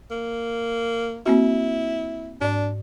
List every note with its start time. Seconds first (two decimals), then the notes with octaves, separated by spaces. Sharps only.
0.11 A#3
1.26 A#3 C4 E4 F#4
2.41 G#2 D4 D5